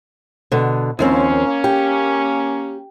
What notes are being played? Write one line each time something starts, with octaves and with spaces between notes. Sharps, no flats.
B2 D3
D#2 F3 A#3 C4 C#4
G4